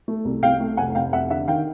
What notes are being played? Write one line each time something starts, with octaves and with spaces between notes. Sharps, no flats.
A3
C2
C2 F5 G5
A3
F1 F#5 G#5
F1 F5 G5
F1 E5 F#5
D3 E5 F#5
D#3 F5 G5